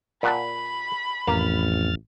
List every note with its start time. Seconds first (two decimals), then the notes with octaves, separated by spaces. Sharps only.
0.23 A#2 F#5 A5 B5
1.27 A1 F2 A#3 F6 A6